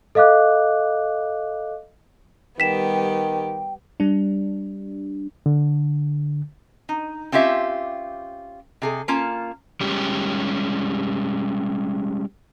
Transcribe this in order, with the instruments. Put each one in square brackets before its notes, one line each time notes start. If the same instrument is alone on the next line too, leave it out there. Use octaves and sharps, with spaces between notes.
[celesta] A4 D#5 F5 D6 F#6
[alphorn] D#3 [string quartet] G3 B3 G4 [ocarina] G5 [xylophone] B6 E7
[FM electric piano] G3 D4
[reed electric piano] D3
[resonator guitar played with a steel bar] D#4
C4 C#4 F4 G4 E5
C3 G#4 A4
A#3 C#4 F4 A5
[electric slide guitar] G3 G#3 C#4 G4